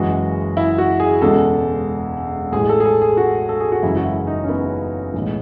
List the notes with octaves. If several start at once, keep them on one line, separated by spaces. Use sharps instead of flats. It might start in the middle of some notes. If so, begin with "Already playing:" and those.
Already playing: F#1 F#2 E3 G#3 F#4
E4
F#4
G#4
E1 E2 C#3 G#3 A4
A1 A2 G#3 G#4
A4
G#4
A4
G#4
F#4
A4
G#4
F#4
F#1 F#2 C#3 E3 G#3 E4
F#4
E4
D#4
C#4
B3
B1 A2 E3 G#3